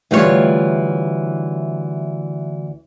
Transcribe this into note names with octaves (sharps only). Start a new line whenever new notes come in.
D2 E3 G3 F4 F#4 C#5